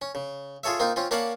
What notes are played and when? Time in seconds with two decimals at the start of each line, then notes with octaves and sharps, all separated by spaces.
0.02 C#4
0.15 C#3
0.64 F4 G#4 A4 C#5 E5
0.80 A#3 C4 D#4 F4
0.96 C4 C#4 F4
1.11 A#3 C#4 D5 F5 F#5 A5